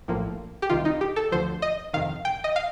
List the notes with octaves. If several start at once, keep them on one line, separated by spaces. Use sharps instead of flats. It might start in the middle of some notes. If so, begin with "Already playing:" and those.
A#1 A2 F3 A#3
G4
C2 C3 D#3 F4
D#4
G4
A4
D2 D3 F3 C5
D#5
F2 C3 D#3 F5
G5
D#5
F5